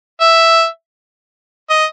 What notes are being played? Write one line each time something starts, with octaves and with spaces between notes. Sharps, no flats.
E5
D#5